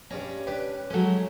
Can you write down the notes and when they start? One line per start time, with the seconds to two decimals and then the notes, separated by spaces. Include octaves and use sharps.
0.11 G2 C#4 D5 A#5
0.47 D4 G4 B4
0.90 F#3 G#3 A3 C#4